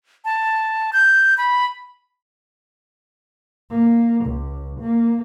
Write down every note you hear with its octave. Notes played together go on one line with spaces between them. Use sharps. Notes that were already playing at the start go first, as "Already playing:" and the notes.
A5
G6
B5
A#3
C#2
A#3